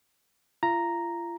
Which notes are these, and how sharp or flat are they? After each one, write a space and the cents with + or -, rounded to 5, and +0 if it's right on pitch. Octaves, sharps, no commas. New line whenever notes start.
F4 -40 A#5 +0